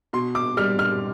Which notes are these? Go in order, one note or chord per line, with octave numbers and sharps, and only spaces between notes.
B2 C6
D6
G3 F6
F6